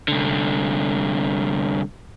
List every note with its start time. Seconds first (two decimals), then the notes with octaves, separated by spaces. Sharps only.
0.08 C2 D3